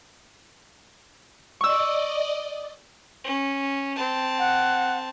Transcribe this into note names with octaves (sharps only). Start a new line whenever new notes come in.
D5 D#5 C#6 E6
C#4
C4 A5
F#5